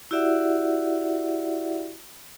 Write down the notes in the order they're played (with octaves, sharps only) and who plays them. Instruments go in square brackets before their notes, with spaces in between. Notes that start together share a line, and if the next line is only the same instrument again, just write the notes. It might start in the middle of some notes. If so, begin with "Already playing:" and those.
[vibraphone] E4 F#4 G4 D5 E5 F#5